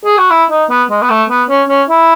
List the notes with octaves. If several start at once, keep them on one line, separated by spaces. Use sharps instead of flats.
G#4
F#4
E4
D#4
B3
G#3
B3
A3
B3
C#4
C#4
E4